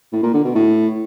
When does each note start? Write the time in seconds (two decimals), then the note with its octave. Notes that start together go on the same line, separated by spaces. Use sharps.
0.12 A2
0.23 A#2
0.34 D3
0.44 B2
0.55 A2